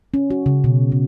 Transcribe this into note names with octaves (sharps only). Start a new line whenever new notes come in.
C#4
F#4
C#3
B2
C#3